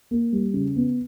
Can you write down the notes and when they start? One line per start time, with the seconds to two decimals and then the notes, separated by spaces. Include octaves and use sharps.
0.11 A#3
0.33 G3
0.54 C#3
0.76 B3